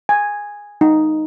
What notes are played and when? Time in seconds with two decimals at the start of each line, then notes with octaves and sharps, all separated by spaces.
0.09 G#5
0.81 D#4